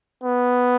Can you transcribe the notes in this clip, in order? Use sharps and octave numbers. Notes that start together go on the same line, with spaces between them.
B3